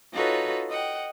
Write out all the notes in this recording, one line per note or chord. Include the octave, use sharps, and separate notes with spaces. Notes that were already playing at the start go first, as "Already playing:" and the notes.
D#4 F4 F#4 A4 B4 C#5
D#5 F#5 G5